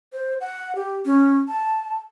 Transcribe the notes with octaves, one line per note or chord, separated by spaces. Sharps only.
C5
F#5
G4
C#4
A5